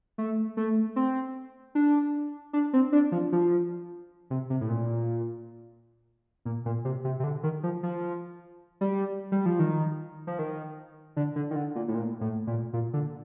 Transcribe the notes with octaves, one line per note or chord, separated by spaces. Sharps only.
A3
A3
C4
D4
D4
C4
D4
F3
F3
C3
C3
A2
A#2
A#2
A#2
C3
C3
C3
D3
D#3
F3
F3
G3
G3
F3
D#3
F3
D#3
D3
D3
D#3
D3
A#2
A2
A#2
A2
A#2
A#2
D3